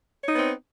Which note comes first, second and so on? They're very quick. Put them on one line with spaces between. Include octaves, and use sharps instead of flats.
C#5 D#4 B3 C4